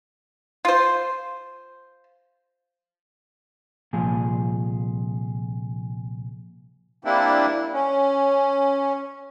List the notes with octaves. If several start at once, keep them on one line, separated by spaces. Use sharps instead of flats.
F4 C5
C2 A#2 F3 G#4
G3 A#3 C4 D4 E4
C#4